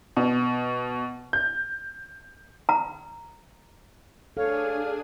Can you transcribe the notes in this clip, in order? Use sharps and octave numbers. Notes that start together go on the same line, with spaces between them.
B2
G6
A#5
D4 G#4 A4 C#5 F5 G#5